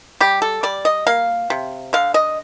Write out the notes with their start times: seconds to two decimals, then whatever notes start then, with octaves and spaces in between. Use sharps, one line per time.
0.20 G3 G4
0.42 A4
0.63 G3 D5
0.85 D#5
1.07 A#3 F5
1.50 C3
1.93 D3 F5
2.14 D#5